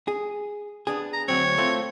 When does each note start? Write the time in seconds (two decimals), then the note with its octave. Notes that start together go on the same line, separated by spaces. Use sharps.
0.08 G#4
0.87 B3 D4 G#4
1.13 A#5
1.28 D2 F#3 C4 C#5
1.58 A3 C4 F4